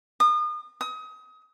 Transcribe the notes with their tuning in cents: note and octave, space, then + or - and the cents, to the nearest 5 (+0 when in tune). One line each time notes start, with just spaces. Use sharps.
D#6 -35
D#6 +30